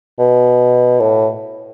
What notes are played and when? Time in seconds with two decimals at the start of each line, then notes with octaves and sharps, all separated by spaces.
0.19 B2
1.00 A2